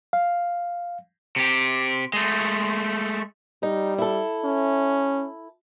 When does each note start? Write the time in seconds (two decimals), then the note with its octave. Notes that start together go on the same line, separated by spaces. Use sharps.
0.13 F5
1.36 C3 G4
2.13 G#3 A3
3.63 G3 D#4
3.98 E4 A4
4.45 C#4